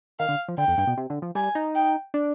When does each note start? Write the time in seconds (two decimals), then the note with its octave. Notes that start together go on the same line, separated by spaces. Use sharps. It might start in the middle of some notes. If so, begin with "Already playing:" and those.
0.19 D#3 F5
0.29 D3
0.48 F3
0.58 D3 G5
0.68 F2
0.78 G2
0.87 B2
0.97 C3
1.10 D3
1.22 F3
1.35 G3 G#5
1.55 D#4
1.75 G5
2.14 D4